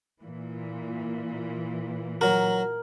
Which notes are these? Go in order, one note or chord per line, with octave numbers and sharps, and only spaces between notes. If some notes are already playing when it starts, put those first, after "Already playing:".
A#2 E3
F#3 F#4 A#4